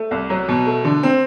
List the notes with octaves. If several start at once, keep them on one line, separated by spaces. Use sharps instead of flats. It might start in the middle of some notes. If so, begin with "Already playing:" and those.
Already playing: A3
C2
F#3
B2
A3
D3
C4